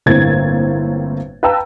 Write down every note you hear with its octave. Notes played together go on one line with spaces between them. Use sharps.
G1 A2 A#3 C4 G#6 A6
B4 F5 G5 A5 A#5 E6